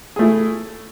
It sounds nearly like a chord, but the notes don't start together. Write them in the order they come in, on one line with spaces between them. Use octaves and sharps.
G#4 A3 E4